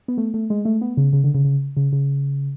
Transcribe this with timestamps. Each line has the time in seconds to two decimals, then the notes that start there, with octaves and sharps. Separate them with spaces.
0.08 B3
0.18 A3
0.34 A3
0.50 G#3
0.65 A3
0.81 B3
0.97 C#3
1.13 C#3
1.24 D3
1.34 C#3
1.45 C#3
1.77 C#3
1.92 C#3